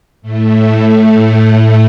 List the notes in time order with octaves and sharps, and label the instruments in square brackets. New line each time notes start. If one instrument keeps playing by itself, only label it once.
[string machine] A2 A3